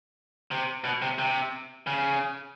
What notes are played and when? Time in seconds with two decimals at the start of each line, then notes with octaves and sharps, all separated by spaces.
0.51 C3
0.85 B2
1.02 C3
1.19 C3
1.87 C#3